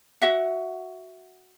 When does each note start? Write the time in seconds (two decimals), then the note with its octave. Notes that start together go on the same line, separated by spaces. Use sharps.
0.22 F#4 E5 F#5